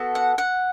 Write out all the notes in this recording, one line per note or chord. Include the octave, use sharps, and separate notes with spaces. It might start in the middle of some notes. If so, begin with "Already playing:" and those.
Already playing: B3 F#4 A4
F#5
F#5